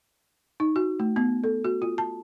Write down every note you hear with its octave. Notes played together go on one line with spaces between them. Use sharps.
D#4
F#4
A3
B3
A4
F#4
F4
A5